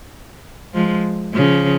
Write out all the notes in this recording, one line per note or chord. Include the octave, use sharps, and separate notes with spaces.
F3 G#3
C#3 F3